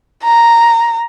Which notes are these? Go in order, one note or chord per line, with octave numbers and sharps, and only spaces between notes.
A#5